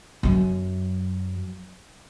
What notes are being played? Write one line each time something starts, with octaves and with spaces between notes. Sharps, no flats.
F#2 F#3